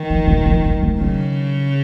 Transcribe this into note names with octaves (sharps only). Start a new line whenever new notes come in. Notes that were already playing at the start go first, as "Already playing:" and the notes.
Already playing: D#3
F3
B2
C#3
F3
F#3
G#3
C#3 F#3